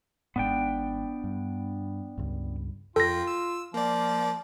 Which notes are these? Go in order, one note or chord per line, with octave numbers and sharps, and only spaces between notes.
G#1 G#2 B3 D4 G5
G2
C#2 G2
F2 F4 A4 G5 A#6
E6
F3 A#3 D5